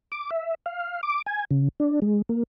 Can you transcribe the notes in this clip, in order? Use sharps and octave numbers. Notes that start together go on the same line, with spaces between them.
D6
E5
F5
D6
G#5
C#3
D4
G#3
A#3